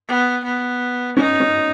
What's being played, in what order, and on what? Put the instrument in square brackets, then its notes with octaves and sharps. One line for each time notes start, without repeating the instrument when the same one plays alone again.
[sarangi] B3
B3
[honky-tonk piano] C#4 [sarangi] D#4
[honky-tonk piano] C#4